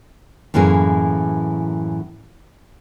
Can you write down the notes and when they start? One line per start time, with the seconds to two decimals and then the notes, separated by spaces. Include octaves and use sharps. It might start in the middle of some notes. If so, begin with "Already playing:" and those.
0.54 F#2 A2 E3 A#3 G#4